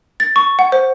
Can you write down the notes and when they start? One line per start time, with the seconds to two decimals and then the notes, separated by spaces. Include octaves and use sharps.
0.20 A6
0.36 C#6
0.59 F#5
0.72 C5